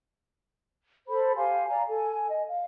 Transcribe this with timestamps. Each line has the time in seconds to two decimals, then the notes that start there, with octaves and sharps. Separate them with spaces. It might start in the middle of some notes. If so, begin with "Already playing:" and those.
1.07 A4 C5 B5
1.36 G4 F5 G#5 C6
1.68 D5 F5 G#5 A#5
1.89 A4 G#5
2.29 D#5
2.48 F5